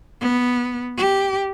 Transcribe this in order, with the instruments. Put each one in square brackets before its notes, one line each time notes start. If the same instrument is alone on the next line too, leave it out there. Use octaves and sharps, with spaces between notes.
[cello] B3
G4